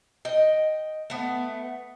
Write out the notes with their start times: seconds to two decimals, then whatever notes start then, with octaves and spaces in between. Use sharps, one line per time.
0.25 D#5 G5
1.10 A3 B3